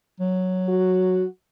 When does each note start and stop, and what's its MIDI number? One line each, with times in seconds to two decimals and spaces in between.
0.20 1.25 54
0.69 1.25 66